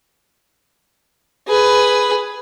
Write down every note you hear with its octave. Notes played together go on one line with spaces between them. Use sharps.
G#4 B4